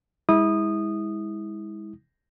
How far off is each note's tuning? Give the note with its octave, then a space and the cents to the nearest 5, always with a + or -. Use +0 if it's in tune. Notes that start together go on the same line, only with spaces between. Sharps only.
G#3 -25 E4 -30 D#6 -15